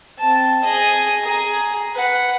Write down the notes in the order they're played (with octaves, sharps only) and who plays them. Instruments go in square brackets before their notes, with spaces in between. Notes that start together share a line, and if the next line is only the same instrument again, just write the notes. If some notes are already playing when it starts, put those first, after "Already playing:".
[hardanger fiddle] C4 A5
G#4 D#5
G#4 A#5
B4 F#5